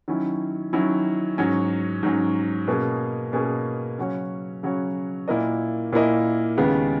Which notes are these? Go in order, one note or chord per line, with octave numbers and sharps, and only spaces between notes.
D#3 F#3 C#4 E4
D#3 F#3 C#4 E4
G#2 F#3 C#4
G#2 F#3 C#4
B2 A#3 C#4 G#4
B2 A#3 C#4 G#4
C#3 F#3 C#4 F#4 C#5
C#3 F#3 C#4 F#4 C#5
A#2 A#3 E4 A#4 D#5
A#2 A#3 E4 A#4 D#5
D#2 C#3 G#3 B3